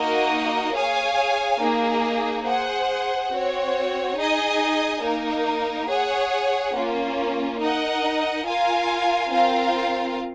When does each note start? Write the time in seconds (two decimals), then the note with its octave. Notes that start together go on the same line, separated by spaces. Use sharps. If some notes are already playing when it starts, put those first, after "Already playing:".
Already playing: A#3 D#4 F#4 A#4 D#5
0.74 G#4 C#5 F5 G#5
1.60 A#3 D#4 G#4
2.46 G#4 C5 F#5
3.32 C4 F#4 C#5
4.17 D#4 G#4 D#5 G#5
5.03 A#3 D#4 A#4
5.88 G#4 C#5 F#5
6.74 A#3 C#4 F4
7.60 D#4 A#4 D#5 F#5
8.46 F4 A#4 F5 G#5
9.31 C4 F4 A#4 F5